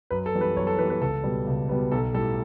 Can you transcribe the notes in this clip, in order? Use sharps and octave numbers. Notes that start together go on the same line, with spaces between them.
F#2 B4
A4
E3 G3 B3
B4
F#2 C#5
A4
E3 G3 B3 B4
B4
C#2 A4
B2 G3 B3
C#2
B2 G3 B3
B1 A4
A2 G3 A4